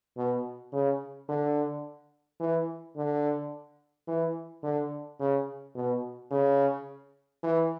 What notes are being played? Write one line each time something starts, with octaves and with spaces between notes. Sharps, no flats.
B2
C#3
D3
E3
D3
E3
D3
C#3
B2
C#3
E3